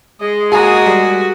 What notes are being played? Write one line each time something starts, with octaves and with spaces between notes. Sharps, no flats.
G#3 D#5
A#3 F#4 G#4 G#5 A#5 D#6
G3